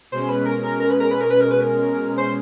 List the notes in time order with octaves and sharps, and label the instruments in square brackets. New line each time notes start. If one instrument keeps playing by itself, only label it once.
[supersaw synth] B2 G#3 C#4 [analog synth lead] C5
[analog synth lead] B4
A#4
A#4
A#4
B4
A#4
B4
A#4
B4
A#4
B4
A#4
C5